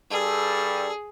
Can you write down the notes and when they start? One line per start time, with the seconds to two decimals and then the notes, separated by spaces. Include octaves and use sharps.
0.10 G2 G3 G#4 A4